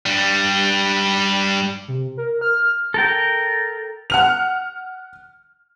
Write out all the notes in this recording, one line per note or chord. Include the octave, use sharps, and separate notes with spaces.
G2 G3
C3
A#4
F6
A4 A#4 G5
F#5 F6 F7